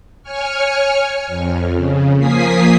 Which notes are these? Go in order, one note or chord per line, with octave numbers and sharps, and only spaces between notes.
C#5 G#5 C#6 F6
F2
C#3
F3 A#3 G#5 D#6 B6 C7